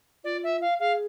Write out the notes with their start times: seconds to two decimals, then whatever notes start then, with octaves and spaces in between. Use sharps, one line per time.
0.24 F4 D5
0.44 E5
0.61 F5
0.80 G#4 F5